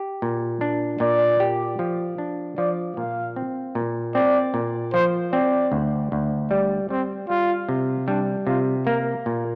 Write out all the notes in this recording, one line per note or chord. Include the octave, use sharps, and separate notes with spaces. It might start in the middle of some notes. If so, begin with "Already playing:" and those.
Already playing: G4
A#2
D4
A#2 D5
G4
F3
D4
F3 D5
A#2 F5
C4
A#2
C4 D5
A#2
F3 C5
C4 D5
D2
D2
G3 D5
G3 C4
G3 F4
C3
G3 D4
C3 F4
A#3 A#4
A#2